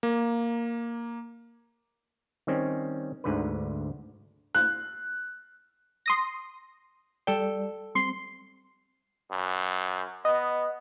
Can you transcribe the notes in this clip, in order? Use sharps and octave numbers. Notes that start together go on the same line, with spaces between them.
A#3
D#3 G3 C4 C#4
D2 G#2 D3 B4
F#6
C6 D#6 A#6
G3 A4 D5 G5
G3 C4 C6
F#2
B3 D#5